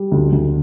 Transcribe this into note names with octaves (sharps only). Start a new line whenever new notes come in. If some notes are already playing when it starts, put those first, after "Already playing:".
Already playing: G3
D2
D2